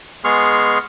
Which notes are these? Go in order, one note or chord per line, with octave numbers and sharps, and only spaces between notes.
G#3 B3 G#4 C6 C#6 F6